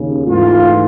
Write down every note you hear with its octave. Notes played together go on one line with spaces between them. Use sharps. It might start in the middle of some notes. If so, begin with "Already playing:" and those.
Already playing: D#2 C#3
G#2 E3 A3 F4